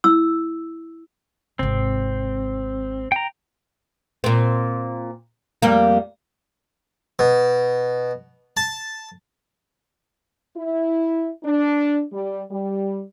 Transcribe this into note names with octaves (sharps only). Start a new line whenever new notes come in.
E4 E6
G#1 C3 C4
G5 A#5
A#2 C4
F2 G3 A#3
B2
A5
E4
D4
G3
G3